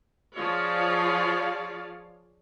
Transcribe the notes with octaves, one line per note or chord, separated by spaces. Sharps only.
F3 F4 G#4 C#5 D5 F5